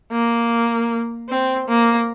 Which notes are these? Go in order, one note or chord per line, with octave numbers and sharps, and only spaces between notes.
A#3
C4
A#3